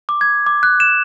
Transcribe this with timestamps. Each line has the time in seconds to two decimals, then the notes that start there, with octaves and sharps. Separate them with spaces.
0.09 D6
0.21 G#6
0.47 D6
0.63 F#6
0.80 E7